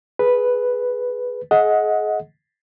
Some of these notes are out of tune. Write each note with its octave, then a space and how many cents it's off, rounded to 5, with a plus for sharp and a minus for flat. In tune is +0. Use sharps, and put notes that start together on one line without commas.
G#4 +10 B4 +0
G#4 +35 D#5 +20 F#5 -15